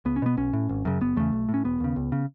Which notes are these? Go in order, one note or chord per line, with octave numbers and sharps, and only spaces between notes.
C#2 B3
C#4
B2 B3
B1 C#4
A2
G#1
F#2 C#3
F#1 B3
E2 C#3 A3
B1
A2
C#4
E1 B3
D#2 C#3
C#2
C#3